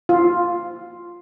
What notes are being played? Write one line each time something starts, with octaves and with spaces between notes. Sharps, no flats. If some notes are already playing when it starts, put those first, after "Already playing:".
F4